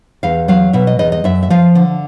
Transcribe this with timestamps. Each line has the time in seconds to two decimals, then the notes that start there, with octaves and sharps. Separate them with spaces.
0.23 E2 F5
0.48 F#3 F5
0.73 B2 E5
0.87 D#5
0.99 E2 D#5
1.12 D#5
1.24 F#2 E5
1.43 E5
1.50 F3 F5
1.75 D3